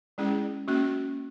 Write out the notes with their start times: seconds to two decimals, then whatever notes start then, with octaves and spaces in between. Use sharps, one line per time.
0.18 G#3 C#4 E4 G#4
0.68 A#3 C#4 F#4